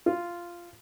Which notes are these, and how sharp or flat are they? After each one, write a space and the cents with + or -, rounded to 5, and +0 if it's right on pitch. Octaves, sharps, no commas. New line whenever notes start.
F4 -10